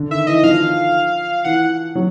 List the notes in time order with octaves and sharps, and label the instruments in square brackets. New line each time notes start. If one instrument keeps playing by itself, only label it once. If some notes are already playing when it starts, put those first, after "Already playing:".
Already playing: [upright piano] D3
[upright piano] D#3 [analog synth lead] E5
[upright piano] E3 [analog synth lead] D#5
[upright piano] F3 [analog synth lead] F5
[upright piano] E3 [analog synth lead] F#5
[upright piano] F#3